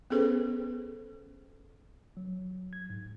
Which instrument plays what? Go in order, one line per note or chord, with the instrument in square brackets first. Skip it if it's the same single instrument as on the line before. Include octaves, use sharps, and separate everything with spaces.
[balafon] B3 C#4 G#4 A4 B4 C5
[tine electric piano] F#3
G#6
G#2